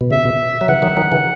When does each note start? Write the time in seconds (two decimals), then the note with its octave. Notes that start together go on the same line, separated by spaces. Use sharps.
0.01 B2
0.11 C#3 E5
0.25 B2
0.61 F#3
0.68 C#3 E3 F#5
0.82 D#3 F#3
0.97 D#3 F#3
1.12 C#3 E3